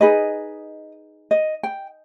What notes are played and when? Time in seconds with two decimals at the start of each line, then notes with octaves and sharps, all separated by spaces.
0.01 D#4 G#4 B4 D#5
1.31 D#5
1.63 G5